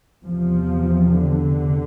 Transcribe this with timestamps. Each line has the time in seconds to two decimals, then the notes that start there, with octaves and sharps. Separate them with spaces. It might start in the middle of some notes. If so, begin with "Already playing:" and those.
0.25 E2 C3 F3
1.14 D3